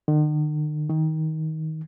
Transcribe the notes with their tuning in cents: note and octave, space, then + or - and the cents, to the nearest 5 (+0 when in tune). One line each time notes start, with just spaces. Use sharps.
D#3 -45
D#3 +20